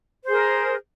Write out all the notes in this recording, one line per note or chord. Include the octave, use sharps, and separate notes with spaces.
G#4 A#4 C5